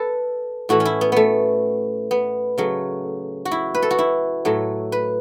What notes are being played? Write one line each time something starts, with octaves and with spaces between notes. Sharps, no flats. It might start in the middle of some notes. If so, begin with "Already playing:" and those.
Already playing: A4 B4
A2 E3 A3 F#4
C#4
E4
B3
A3 B3
B3
C#3 F#3 A3
F#4
E4
B4
A4
F#4
E4
A2 F#3 A3
B4